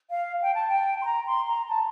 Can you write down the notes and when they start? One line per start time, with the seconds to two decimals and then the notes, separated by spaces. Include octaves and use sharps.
0.10 F5
0.42 G5
0.55 A5
0.68 G5
1.01 C6
1.05 A#5
1.26 C6
1.47 A#5
1.68 A5